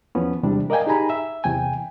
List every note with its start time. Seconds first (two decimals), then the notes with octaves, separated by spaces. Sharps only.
0.15 E2 F3 B3 C#4
0.43 E2 C3 G3 G#3 D4
0.70 A#4 D5 D#5 F5 G5 G#5
0.86 D#4 G4 G#4 G#5 A#5 B5
1.10 E5
1.44 E2 C3 G5 G#5